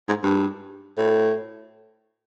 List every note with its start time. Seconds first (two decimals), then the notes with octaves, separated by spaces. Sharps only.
0.08 G#2
0.23 G2
0.98 A2